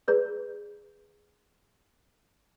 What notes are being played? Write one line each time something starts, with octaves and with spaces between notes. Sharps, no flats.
G#4 B4 D5